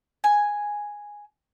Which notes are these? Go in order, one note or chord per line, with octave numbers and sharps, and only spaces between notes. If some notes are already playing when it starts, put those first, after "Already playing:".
G#5